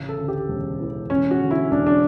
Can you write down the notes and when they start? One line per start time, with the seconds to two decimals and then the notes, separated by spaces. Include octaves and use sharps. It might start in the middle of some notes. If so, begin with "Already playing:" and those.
Already playing: A1 C#3 E3
0.09 A4
0.18 D2
0.28 G4
0.48 E1
0.80 E3
1.10 E1 C#4
1.31 F#4
1.41 D3
1.51 E4
1.71 E1 D4
1.86 D4